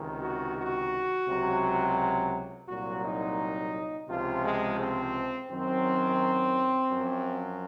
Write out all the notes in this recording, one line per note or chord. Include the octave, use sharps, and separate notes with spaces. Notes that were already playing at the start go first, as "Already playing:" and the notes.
Already playing: C#2 C3 D#3
F#4
F#4
C#2 C3 F#3
C2 A#2 F#3 F#4
D#4
C#2 C3 F3 F4
G#3
C4
F#2 D#3 F#3 C4
F#2 F3